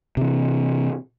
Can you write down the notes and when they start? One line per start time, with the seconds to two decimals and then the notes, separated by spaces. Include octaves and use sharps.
0.17 C3 E3